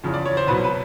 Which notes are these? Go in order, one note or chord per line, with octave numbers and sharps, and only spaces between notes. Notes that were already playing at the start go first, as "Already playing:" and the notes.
E2 C#3 F3
D5
C#5
C5
C2 B2 F#3 B4
B4